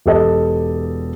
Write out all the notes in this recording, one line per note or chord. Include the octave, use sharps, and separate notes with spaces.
E1 G4 A4 D#5